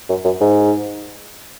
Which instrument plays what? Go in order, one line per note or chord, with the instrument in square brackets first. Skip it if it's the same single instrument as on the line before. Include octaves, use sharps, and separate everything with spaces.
[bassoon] F#2
F#2
G#2